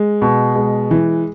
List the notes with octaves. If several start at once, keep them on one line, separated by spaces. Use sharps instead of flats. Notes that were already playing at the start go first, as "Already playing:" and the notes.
Already playing: G#3
B2
G#3
E3